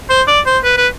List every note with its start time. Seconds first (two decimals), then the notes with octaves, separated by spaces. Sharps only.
0.10 C5
0.28 D5
0.46 C5
0.64 B4
0.77 B4